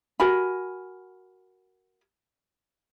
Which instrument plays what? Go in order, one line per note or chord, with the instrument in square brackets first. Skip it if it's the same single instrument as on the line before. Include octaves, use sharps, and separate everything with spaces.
[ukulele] F#4 A#4 G#5 B5